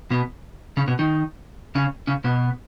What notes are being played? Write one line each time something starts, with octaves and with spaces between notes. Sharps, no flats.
B2 B3
C#3 C#4
B2 B3
D#3 D#4
C#3 C#4
C#3 C#4
B2 B3